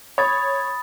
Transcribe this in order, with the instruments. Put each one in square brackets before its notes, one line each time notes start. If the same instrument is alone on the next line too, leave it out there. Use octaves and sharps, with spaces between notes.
[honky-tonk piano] C#5 [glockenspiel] B5 D#6 A6